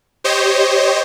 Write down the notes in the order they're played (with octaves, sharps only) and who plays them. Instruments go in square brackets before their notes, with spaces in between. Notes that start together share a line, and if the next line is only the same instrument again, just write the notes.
[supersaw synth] G4 C5 C#5 D#5